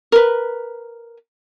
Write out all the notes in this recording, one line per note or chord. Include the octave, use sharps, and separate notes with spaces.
A#4 B4